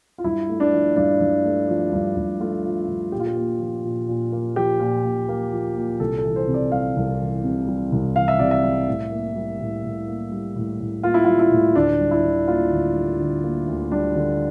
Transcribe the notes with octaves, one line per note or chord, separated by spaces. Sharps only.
F4
G2 E4
A3
D4
F3
G2 D4
G2
A3
F3
G2
G2
A3 F4
F3
G2
A#2 G4
F4
G4
A#3
F3
A#2
A#2
A#3
F3 G4
A#2
A#2
A#3
F3
A#2
C2 A4
A4
E3
C5
C3
D5
G3 F5
C2
E3
C3
G3
C2
E3 F5
E5
C3 D5
E5
G3
A2
A#3
G3
A2
A2
A#3
G3
A2
A2
A#3 F4
E4
G3 F4
E4
A2
D2 D4
G3
E4
D3
A#3 F4
D2
G3
D3
A#3
D2
G3 D4
D3